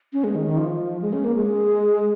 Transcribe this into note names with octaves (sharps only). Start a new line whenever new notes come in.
C#4
G#3
D#3
D#3
F3
G#3
C#4
A#3
G#3